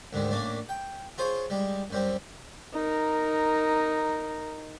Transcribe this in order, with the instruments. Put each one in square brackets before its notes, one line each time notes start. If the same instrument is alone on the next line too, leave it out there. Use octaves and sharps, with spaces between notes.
[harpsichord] D2 G#2 D3 D#3
A2 A#3 C#4 D4
G5
F4 G#4 C5 C#5
G3 G#3
F#2 G3 C4
[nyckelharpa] D#4 A#4